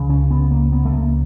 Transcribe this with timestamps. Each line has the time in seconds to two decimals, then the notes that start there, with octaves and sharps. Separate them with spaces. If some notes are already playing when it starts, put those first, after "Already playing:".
Already playing: C#2 C#3
0.10 C#4
0.31 B3
0.51 A#3
0.72 B3
0.85 A3
0.93 A#3